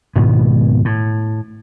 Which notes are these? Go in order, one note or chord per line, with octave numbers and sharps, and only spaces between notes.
G#1 G#2 B2 B3
A2